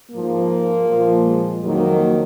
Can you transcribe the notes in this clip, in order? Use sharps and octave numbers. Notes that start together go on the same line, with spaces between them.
G#2 F3 A#3
A#2 F3
G#3
F2 D#3 F#3 A#3